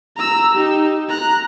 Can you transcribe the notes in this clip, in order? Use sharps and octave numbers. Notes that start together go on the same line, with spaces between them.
A#5 E6
D#4 G4
A#5 F#6